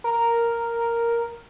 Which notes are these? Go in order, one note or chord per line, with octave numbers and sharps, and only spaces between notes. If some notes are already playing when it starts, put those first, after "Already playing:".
A#4